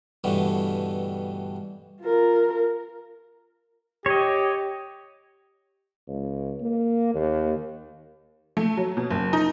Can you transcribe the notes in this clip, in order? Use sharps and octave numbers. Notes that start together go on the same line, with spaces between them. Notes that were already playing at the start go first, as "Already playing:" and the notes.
G2 B2 D3 E3 G3 A3
F4 A#4
G4 C#5 D#5
C#2
A#3
D#2
A3
F#3
B2
F#1
D#4